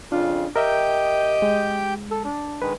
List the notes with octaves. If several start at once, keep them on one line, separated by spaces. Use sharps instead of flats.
F2 C#3 D4 F4
G4 A#4 D#5 E5 G5 G6
G#3
A4
D4
D#3 G#3 B4